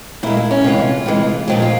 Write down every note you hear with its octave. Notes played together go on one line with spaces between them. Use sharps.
A#2 G#3 E4
E4
C#4
C3 E3 G#3 F4
C3 E3 G#3
A#2 F3 G#3 G4
F4